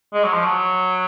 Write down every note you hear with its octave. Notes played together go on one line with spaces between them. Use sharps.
G#3
F#3
F3
F#3